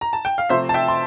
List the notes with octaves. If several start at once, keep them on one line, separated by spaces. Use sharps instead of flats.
A#5
A5
G5
F5
C3 F3 A3 C4 C5 E5
A5
E5 G5
C6